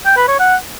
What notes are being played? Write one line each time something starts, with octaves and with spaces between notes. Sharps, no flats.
G5
B4
C#5
F#5